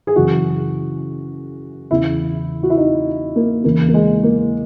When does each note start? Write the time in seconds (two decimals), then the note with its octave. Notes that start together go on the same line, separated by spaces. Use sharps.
0.07 G#4
0.16 F#2 C#3 E3 F#4
1.91 E2 C#3 E3 E4
2.63 F#4
2.70 E4
2.77 D#4
3.36 A#3
3.64 E2 C#3 E3 A#3
3.88 A#3
3.94 G#3
4.23 A#3